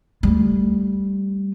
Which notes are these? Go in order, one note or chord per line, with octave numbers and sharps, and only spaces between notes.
G3 A3